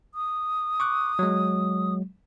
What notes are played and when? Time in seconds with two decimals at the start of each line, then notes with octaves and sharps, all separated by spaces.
0.15 D#6
0.80 C#6 D6 F#6
1.19 F#3 G#3